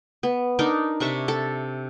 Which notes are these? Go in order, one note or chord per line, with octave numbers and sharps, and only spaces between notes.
B3
D4 D#4 A#4
C3 D4 E5 C#6
A4